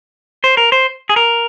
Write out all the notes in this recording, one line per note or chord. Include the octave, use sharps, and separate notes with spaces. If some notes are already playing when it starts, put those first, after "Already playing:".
C5
A#4
C5
G#4
A#4